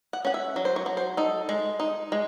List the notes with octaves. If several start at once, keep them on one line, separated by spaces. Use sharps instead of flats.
F#5
C#4 F#5
E5
F#3
C5
C#5
F#3
C5
D#4 A4
G#3
D#4
G#3